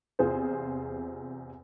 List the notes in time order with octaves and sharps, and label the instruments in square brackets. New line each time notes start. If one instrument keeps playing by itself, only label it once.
[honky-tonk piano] E2 C3 F4 G#4 C5